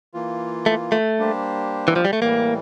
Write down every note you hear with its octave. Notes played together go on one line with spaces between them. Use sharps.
E3 A#3 F4
A3
A3
G3 A#3 D4 G4 C5
E3
F3
G3
A3
A2 E3 G3 A#3